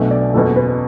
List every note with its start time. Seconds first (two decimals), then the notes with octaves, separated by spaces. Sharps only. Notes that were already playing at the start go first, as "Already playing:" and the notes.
Already playing: B1 B2 A3 D4 E5
0.11 D5
0.34 F#1 E2 B2 A4
0.56 B4